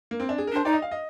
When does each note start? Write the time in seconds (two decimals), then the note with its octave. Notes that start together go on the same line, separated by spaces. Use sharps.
0.11 A#3
0.20 C4
0.29 D4
0.38 G#4
0.47 A#4
0.52 D4 C5
0.65 D#4 D5
0.73 D#5
0.82 F5
0.91 D#5